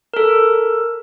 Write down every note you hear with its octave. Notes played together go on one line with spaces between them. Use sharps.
A4 A#4